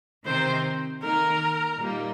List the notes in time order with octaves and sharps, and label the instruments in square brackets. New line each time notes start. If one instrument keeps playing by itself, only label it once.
[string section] C3 D#3 C4 D#4 [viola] C5
[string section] D#3 A#3 D#4 [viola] A#4
[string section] A#2 G3 A#3 D#4